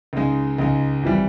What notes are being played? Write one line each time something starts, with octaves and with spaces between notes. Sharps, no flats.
C#2 C#3 G#3 D#4
C#2 C#3 G#3 D#4
G#1 E3 G3